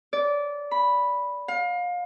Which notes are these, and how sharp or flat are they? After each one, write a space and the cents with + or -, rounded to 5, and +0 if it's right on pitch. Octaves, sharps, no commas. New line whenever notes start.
D5 -20
B5 -5
F5 +30